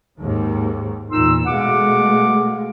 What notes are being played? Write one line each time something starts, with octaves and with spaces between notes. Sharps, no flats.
D#2 G#2
E2 A#2 D#4 C6 E6
B2 G#3 A3 F5 F#5 D6